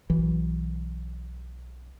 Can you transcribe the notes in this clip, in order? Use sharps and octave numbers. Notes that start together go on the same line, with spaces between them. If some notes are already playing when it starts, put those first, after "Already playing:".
B1 E3